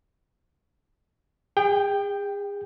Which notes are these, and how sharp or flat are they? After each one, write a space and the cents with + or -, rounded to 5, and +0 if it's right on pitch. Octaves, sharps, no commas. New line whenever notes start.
G#4 -40 G5 +5